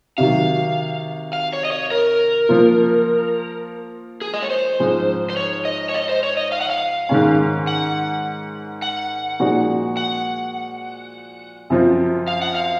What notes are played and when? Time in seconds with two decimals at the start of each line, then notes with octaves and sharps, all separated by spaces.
0.18 C3 D#3 F#3 F5
1.33 F5
1.53 C#5
1.65 D#5
1.72 C#5
1.91 A#4
2.49 F3 A#3 F4
4.22 G#4
4.34 D#5
4.42 C#5
4.50 C5
4.80 G#2 F3 G#3
5.30 C5
5.37 C#5
5.65 D#5
5.89 C#5
5.94 D#5
6.09 C5
6.23 C#5
6.37 D#5
6.52 F5
6.61 F#5
6.70 F5
7.09 G#2 D#3 G#3 C#4
7.67 F#5
8.82 F#5
9.40 A#2 F3 G#3 D#4 F#4
9.97 F#5
11.70 F#2 F3 C4 F4
12.28 F5
12.42 F#5
12.55 F5